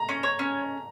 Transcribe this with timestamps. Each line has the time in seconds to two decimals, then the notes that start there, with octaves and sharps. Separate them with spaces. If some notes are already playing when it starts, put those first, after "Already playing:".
Already playing: A#5
0.09 C#4
0.23 C#5
0.39 C#4